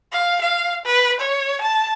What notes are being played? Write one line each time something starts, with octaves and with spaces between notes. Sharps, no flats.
F5
F5
B4
C#5
A5